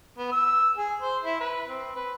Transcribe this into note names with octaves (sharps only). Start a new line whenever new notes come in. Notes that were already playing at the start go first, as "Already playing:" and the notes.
B3
E6
G#4
C5
E4
B4
C4
B4